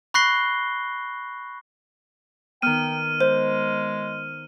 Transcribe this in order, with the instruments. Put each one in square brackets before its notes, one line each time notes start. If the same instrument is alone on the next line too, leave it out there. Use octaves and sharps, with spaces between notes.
[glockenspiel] B5 C#6 F#6 A#6 C7 G7
[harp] D#3 B3 [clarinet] G5 [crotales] F6 D#7
[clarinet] G#3 [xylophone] C5